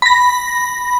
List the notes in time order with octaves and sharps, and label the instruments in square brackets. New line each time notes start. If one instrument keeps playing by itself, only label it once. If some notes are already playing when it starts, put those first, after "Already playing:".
[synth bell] B5 A#6